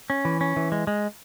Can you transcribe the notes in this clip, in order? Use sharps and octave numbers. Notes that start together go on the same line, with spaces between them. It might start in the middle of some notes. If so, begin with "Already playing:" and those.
C#4
E3
C#4
E3
G#3
G#3